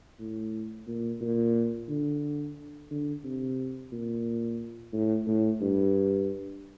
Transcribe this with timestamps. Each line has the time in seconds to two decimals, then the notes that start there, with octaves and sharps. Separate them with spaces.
0.19 A2
0.87 A#2
1.21 A#2
1.89 D3
2.91 D3
3.24 C3
3.92 A#2
4.93 A2
5.27 A2
5.61 G2